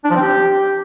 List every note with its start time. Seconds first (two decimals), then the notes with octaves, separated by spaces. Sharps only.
0.04 D4
0.10 F3
0.16 C4
0.22 G4